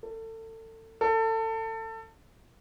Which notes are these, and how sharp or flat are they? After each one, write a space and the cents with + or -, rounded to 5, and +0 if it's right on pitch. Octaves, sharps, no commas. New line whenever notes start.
A4 +30
A4 +25